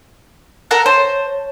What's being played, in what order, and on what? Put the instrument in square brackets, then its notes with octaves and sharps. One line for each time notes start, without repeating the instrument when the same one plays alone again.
[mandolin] A4 A#4 F#5
[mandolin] C5 [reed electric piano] C#5 A5